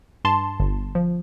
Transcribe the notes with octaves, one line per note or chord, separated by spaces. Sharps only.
G2 A5 C6
G1
F3